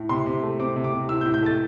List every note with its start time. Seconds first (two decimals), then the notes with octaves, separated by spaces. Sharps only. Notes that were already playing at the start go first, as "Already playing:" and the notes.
Already playing: A2
0.09 C3 C6
0.26 C3
0.43 A3
0.59 C4 D6
0.76 C3
0.84 D6
0.93 C3
1.09 A2 E6
1.21 G6
1.26 A2
1.34 G6
1.42 A3 A6